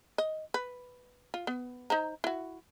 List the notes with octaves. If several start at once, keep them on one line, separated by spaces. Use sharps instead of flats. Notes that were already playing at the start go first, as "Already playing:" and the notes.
D#5
B4
F4
B3
D#4 C5 A#5
E4 F#4